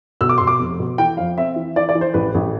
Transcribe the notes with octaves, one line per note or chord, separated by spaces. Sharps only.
B2 E6
D6
B2 C6
D6
F1
B2
E3 G5
F2 F5
C4 E5
E3
E3 D5
D5
E3
C5
A1 B4
A1